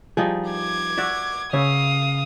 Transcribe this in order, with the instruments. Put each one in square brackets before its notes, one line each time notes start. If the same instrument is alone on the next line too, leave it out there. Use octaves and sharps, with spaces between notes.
[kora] F3 G3 D#4 [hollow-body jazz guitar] G#4
[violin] D6 G#6
[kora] F#4 D5 E5
[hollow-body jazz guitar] C#3 C#5 [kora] E5 [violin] F5 D#6